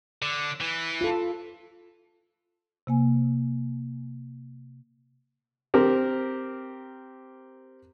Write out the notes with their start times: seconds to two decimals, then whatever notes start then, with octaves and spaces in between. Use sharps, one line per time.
0.22 D3
0.61 E3
1.01 F4 A4
2.87 C3 A#3 G#5
5.74 C4 G4 A#4